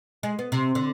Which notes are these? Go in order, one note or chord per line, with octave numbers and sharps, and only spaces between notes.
G#3
B3
C3
D3